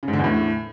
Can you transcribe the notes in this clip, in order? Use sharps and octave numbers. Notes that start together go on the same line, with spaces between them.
C#3
G#2
D3
E2
A2